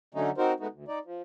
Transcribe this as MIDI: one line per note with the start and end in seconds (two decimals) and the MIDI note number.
0.14 0.30 50
0.14 0.30 54
0.14 0.30 57
0.14 0.30 61
0.14 0.30 63
0.38 0.53 60
0.38 0.53 63
0.38 0.53 66
0.38 0.53 70
0.38 0.53 72
0.60 0.67 56
0.60 0.67 57
0.60 0.67 59
0.60 0.67 63
0.60 0.67 66
0.71 0.85 38
0.88 0.99 63
0.88 0.99 74
1.05 1.22 53